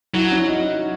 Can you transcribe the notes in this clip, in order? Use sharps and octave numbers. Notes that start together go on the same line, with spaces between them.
F#3 E4
F#4
C#4 E4
D#4 F#4